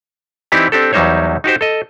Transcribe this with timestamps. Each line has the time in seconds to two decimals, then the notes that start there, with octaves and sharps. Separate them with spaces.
0.52 E3 C4 D#4 E4 G4 D5
0.72 C4 D4 G4 A4
0.93 E2 F#3 G3 D#4 C5 C#5
1.44 D#4 F#4 G4 C5
1.61 A4 D#5